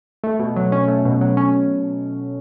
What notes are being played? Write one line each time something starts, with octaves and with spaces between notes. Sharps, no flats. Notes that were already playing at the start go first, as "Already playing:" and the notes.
A3
B2
F#3
C#4
A3
B2
F#3
C#4